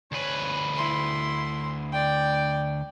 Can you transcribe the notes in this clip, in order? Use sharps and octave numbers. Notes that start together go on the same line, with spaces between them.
D2 B4 C#5 G#5
E4 C6
D5 G5